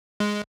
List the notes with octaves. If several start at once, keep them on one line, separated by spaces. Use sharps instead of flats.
G#3